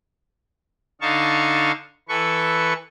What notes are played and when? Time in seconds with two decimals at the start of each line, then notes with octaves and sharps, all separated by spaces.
1.01 D3 D#4 F5 A5 C#6
2.09 E3 A4 B4 C#6